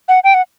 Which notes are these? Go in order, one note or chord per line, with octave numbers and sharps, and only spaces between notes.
F#5
G5
F#5